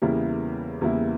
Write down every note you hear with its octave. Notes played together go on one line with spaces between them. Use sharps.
E2 C#3 G3 A#3 E4
E2 C#3 G3 A#3 E4